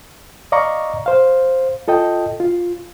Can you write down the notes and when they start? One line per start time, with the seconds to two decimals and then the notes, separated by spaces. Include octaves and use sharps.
0.52 D5 D#5 F5 A#5 C#6
1.06 C5 F5
1.88 F4 A4 D#5 G5
2.40 F4